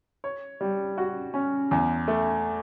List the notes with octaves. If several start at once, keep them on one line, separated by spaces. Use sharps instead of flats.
C#5
G3
F#4
C#4
E2
A3